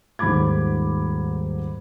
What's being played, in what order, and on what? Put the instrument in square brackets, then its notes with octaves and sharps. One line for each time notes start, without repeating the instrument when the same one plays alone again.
[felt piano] D#1 G#2 B5 D6 G#6